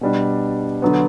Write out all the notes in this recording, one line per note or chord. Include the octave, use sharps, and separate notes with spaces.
B2 G3 D4
D3 F#3 B3